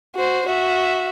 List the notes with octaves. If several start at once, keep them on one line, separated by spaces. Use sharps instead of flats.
F#4 C5
F#4 E5